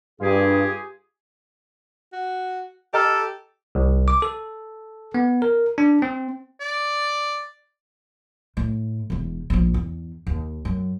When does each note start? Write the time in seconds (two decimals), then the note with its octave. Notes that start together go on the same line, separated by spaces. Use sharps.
0.21 G2 F4 G4 G#4
2.13 F#4
2.94 G4 A4 D#5 A#5 F6
3.75 C2
4.08 D6
4.22 A4
5.14 B3
5.42 A#4
5.78 D4
6.02 C4
6.60 D5
8.57 A2
9.10 E1 E2
9.50 A#1 F3
9.74 E2
10.27 D#2
10.65 F#2